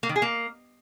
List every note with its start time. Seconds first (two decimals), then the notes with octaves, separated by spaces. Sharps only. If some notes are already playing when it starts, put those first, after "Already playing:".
0.03 A#3
0.09 D#3
0.16 G#4
0.22 A#3